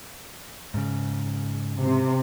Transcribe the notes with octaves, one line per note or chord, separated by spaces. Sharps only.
G#2 C#3
C3